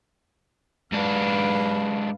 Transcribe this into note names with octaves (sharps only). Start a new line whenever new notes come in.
G#2 D4 B4 F5